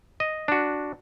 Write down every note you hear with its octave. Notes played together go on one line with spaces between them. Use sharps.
D#5
D4 F#4